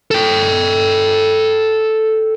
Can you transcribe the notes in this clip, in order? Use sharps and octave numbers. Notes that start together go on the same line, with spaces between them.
A4 G5